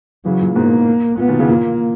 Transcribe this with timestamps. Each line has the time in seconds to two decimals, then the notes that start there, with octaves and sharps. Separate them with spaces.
0.25 C#3 E3 F#3
0.41 A#2 C#3
0.56 G#2 B2 A#3
1.18 A#2 B3
1.28 B2 D#3
1.39 C#3 E3
1.49 A#2 A#3